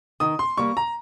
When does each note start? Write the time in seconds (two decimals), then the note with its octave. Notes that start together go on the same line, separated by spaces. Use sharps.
0.20 D#3 D#6
0.39 C6
0.57 G3 A#3 C#6
0.77 A#5